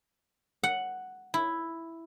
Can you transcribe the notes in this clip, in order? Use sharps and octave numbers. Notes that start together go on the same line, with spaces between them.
F#5
E4